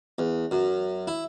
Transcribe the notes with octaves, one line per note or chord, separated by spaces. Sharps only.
E2
F#2
E4